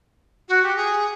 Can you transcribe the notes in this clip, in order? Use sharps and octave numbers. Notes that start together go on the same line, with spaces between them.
F#4
G4
G#4